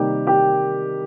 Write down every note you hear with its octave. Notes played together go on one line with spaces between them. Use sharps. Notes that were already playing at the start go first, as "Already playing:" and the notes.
Already playing: C3 D#3 G3 A#3 D#4 G4 G5
G4 G5